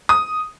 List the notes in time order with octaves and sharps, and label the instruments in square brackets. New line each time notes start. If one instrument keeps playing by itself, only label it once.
[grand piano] D#6